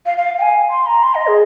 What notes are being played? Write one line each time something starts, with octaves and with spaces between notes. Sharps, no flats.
F5
F5
G5
G#5
C6
A#5
C6
D#5
G#4